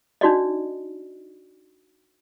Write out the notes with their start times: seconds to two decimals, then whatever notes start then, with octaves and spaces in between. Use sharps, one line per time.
0.21 D4 D#4 F#4 D5 D#5